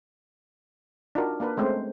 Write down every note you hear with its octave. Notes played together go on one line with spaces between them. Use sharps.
D4 D#4 F4 F#4 A#4
A#3 D4 A#4 B4
G#3 A3 C4 C#4 C5